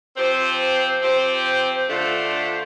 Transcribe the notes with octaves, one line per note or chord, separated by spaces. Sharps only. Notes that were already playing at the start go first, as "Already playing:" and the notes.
F3 C4 G4 C5
F3 C4 G4 C5
D3 A3 D4 F4 C5